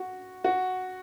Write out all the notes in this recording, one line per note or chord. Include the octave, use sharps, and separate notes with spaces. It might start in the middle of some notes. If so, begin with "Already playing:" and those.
Already playing: F#4
F#4